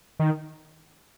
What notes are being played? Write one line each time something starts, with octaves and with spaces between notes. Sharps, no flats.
D#3